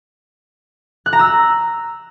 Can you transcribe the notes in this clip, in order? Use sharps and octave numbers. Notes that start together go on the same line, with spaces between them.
F#6
A#5
E6